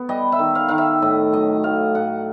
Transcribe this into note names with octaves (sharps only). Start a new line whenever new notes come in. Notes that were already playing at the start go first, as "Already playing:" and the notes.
Already playing: B3
G3 D#5
E5
D#3
F5
D#3 F5
E5
A2 D#5
F#3 D#5
A2 F5
A2 F#5